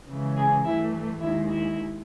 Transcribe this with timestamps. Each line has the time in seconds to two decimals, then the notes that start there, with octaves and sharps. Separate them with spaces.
0.08 C#3 E3 G#3
0.36 G#4
0.64 G2 E3 A3 E4
1.20 D#2 D#3 G#3 E4
1.49 E4